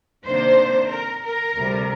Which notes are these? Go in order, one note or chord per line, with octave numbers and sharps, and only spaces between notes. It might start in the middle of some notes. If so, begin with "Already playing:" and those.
C3 D#3 A#3 D4 C5
A#4
A#4
D2 C3 G3